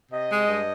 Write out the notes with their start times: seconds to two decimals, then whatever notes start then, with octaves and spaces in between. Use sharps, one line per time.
0.12 C3 D#5
0.30 G#3
0.48 G2